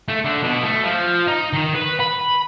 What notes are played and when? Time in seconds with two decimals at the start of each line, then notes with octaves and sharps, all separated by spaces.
0.08 A3
0.25 D3
0.43 B2
0.63 A3
0.83 F3
1.27 D#4
1.53 D#3
1.75 B4
2.00 B5